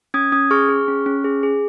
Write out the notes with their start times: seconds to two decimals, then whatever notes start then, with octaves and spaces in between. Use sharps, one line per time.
0.14 C#4 D#6 G#6
0.32 C#4 D#6 G#6
0.51 G#4 C#6 F6
0.69 G#4
0.88 C#4
1.06 C#4
1.24 G#4
1.43 G#4